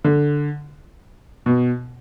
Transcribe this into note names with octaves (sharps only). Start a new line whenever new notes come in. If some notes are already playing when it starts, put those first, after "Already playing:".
D3
B2